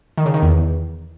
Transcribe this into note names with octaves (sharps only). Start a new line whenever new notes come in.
D#3
C#3
D#3
E2